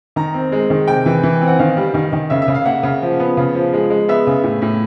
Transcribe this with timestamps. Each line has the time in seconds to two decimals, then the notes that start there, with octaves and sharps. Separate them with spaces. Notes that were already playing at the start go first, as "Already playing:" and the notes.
0.16 D#3 A#5
0.34 C4
0.52 G#3
0.70 D#3
0.88 C3 G5
1.06 E3
1.23 E3
1.41 C4
1.48 F#5
1.59 D#3 F5
1.77 G3
1.94 D#3
2.13 D#3
2.30 C#3 E5
2.42 E5
2.48 C#3
2.54 F5
2.65 A#3 F#5
2.83 C#3
3.02 F3
3.20 B3
3.37 C#3
3.55 F3
3.73 G#3
3.90 G#3
4.08 B3 E5
4.27 C#3
4.43 A2
4.62 A2